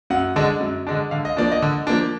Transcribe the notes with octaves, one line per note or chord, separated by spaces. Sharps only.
F#2 F#5
D3 G#3 D4
F#2
D3 G#3 D4
D3 F5
D#5
F3 A#3 D4 D5
D#5
D3
F3 A#3 D4